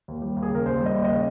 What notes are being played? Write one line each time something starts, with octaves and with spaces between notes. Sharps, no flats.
D#2
G3
D#2
G#4
C#3 A#4
D#2 C5
G3
D#5
D#2
C#3 D#5